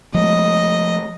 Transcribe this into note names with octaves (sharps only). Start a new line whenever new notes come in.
F3 G#3 A3 D#5